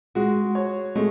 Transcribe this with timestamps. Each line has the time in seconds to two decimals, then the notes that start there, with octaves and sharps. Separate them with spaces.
0.15 G#3 F#4
0.55 C#5
0.95 G#3 A3